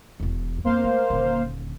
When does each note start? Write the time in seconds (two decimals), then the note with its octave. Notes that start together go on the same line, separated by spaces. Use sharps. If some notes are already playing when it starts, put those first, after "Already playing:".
0.20 E1 E2
0.64 F2 A#3 B3 C5 F5
0.84 A3
1.10 D#1 D3